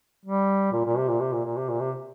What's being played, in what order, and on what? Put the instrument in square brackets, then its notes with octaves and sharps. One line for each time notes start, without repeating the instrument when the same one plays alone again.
[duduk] G3
A#2
A#2
C3
A#2
C3
A#2
A#2
C3
A#2
C3